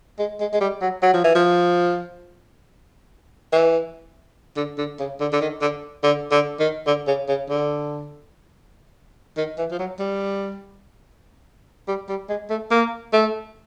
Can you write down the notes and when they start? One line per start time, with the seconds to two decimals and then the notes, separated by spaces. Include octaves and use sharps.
0.19 G#3
0.40 G#3
0.53 G#3
0.61 G3
0.82 F#3
1.03 F#3
1.14 F3
1.24 E3
1.35 F3
3.53 E3
4.57 D3
4.78 D3
5.00 C#3
5.21 D3
5.33 D3
5.41 D#3
5.61 D3
6.03 D3
6.32 D3
6.59 D#3
6.87 D3
7.08 C#3
7.29 C#3
7.50 D3
9.37 D#3
9.58 E3
9.71 F3
9.79 F#3
9.99 G3
11.88 G3
12.09 G3
12.29 G#3
12.50 A3
12.71 A#3
13.13 A3